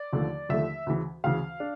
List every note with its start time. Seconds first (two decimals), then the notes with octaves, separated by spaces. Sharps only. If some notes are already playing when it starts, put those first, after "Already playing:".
Already playing: D5
0.13 D#2 D3 F3 A3
0.49 D#2 D3 F3 A3 E5
0.86 D2 C#3 E3
1.24 D2 C#3 E3 F5
1.60 D4